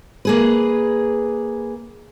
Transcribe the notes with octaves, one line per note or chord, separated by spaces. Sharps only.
A#3 G#4 B4